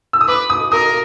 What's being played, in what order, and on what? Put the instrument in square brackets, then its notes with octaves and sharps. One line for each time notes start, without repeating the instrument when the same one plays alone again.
[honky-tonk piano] E6
D#6
[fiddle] B4 [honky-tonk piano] D6
[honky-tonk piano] D#6
[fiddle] A#4 [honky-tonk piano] D#6